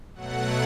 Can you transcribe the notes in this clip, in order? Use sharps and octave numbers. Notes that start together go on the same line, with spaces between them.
B2 F#3 A3 F#5